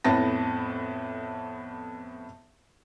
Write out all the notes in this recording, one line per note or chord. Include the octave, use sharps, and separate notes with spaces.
F2 A2 B3 A5 A#6